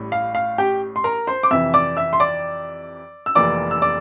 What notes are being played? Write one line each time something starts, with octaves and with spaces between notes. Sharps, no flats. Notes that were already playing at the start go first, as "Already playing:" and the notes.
Already playing: A1 A2 G3
F5
F5
G4 G5
C6
A#4 A#5
C5 C6
D6
F2 C3 E3 E5 E6
D5 D6
E5 E6
C6
D5 D6
E6
F1 F2 E3 A#3 D5 D6
E6
D5 D6